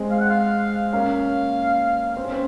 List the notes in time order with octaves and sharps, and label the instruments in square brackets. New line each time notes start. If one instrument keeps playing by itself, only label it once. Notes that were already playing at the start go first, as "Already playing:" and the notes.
Already playing: [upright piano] G#3 C4
[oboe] F5
F#5
F5
[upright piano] A#3 C#4 [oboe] F5
[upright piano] C4
C#4
C4